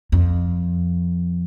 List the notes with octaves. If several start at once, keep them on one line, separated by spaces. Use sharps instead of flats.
F2